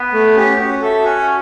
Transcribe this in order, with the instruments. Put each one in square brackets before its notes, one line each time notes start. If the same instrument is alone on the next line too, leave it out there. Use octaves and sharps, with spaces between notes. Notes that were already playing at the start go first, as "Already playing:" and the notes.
Already playing: [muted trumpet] B3
[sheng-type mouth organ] A3
C#4 G4
F#4
A4 E5
[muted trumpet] C#4 [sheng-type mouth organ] F#4